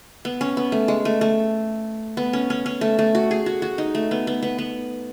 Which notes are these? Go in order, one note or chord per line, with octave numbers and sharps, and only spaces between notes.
B3
C#4
B3
A3
G#3
A3
A3
B3
C#4
C#4
C#4
A3
A3
F#4
G#4
F#4
F#4
D#4
A3
B3
B3
B3
B3